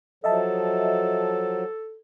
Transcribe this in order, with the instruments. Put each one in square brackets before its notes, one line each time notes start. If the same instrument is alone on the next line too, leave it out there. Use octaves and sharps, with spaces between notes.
[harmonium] F3 F#3 [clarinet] A4 [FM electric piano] D#5 E5 A5